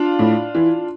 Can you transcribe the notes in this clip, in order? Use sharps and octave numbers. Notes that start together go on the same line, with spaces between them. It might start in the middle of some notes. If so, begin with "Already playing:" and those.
Already playing: D4 F4
A2
E3